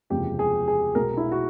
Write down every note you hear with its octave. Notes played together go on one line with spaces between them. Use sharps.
F#1 E2 C3 F3 G#3 G4
G#4
G#4
B1 B2 G#3 A#4
E4
F#4